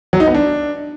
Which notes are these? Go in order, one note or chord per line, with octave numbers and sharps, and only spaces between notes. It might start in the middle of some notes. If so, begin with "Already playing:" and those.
F#3
D#4
B3
D4